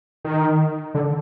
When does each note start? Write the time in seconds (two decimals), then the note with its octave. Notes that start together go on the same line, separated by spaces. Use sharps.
0.25 D#3
0.95 D3